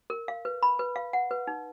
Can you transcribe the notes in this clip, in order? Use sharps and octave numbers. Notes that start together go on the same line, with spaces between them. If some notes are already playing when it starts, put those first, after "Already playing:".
A#4
F5
B4
B5
B4
F5
F#5
B4
D#4